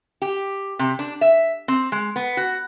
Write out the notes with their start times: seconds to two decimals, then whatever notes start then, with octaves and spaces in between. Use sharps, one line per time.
0.22 G4
0.79 C3
0.99 D4
1.21 E5
1.68 C4
1.92 G#3
2.16 B3
2.37 F#4